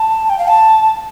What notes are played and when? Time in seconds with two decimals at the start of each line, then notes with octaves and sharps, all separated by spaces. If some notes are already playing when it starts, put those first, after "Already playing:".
Already playing: A5
0.29 G5
0.38 F5
0.48 A5